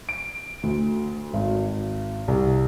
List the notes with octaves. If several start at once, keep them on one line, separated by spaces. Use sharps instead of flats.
D7
D2
G#1
C2